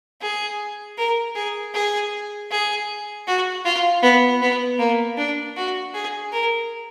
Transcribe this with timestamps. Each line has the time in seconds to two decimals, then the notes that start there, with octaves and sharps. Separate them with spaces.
0.21 G#4
0.98 A#4
1.35 G#4
1.74 G#4
2.51 G#4
3.27 F#4
3.65 F4
4.03 B3
4.41 B3
4.79 A#3
5.17 D4
5.56 F#4
5.94 G#4
6.32 A#4